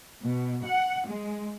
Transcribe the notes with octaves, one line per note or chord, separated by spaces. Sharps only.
B2
F#5
G#3